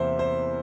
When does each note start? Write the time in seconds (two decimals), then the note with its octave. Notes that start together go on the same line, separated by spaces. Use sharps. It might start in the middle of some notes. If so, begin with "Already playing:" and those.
Already playing: E2 C3 E3 A#3 C5 E5
0.19 C5